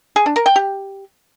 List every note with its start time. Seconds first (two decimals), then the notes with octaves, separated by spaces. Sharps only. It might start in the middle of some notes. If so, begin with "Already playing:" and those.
0.16 G#4
0.26 D4
0.36 A#4
0.46 G5
0.56 G4